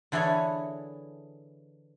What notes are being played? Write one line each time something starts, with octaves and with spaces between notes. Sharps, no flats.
D3 E3 E4 G#4 A4 C#5